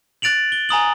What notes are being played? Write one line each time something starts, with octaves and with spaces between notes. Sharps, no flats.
F#6 A6 D7 F7 F#7
G7
G#5 A#5 D#6 F#7